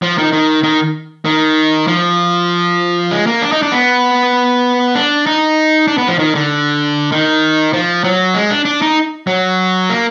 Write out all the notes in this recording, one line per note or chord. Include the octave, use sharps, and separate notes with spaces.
F3
D#3
D#3
D#3
D#3
F3
G#3
A#3
D4
D#4
D4
B3
D4
D#4
D4
B3
F3
D#3
D3
D#3
F3
F#3
G#3
D4
D4
D#4
F#3
A#3